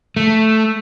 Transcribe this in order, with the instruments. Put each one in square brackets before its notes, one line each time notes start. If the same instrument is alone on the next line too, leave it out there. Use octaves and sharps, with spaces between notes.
[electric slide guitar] A3